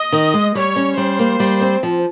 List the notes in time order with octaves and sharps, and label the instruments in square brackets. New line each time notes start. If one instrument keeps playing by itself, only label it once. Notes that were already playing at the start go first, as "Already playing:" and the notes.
Already playing: [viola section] D#5
[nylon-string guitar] D#3
G#3
[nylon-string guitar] G3 [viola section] C#5
[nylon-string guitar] C#4
[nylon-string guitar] G3 [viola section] C5
[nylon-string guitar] A#3
G3
C4
F3